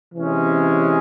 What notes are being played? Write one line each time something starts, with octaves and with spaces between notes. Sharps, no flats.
C3 E3 G#3 C#4